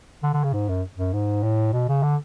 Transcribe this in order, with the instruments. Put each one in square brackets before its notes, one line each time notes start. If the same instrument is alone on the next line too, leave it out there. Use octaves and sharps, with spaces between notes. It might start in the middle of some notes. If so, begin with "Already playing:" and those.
[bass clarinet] D3
D3
C#3
G#2
F#2
F#2
G#2
A2
B2
C#3
D3